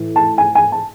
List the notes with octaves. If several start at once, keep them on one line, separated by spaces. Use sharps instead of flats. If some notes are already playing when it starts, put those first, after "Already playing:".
Already playing: A2 E3
A5
G#5
G#5
A5